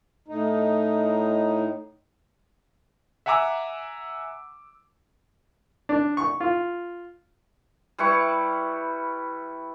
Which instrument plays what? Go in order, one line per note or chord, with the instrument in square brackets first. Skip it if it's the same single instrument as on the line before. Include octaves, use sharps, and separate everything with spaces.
[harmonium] A2 D#4
[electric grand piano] E5 F#5 G#5 A#5 D6 E6
[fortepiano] D4
C#6
F4
[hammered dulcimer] G3 E4 B4 C#6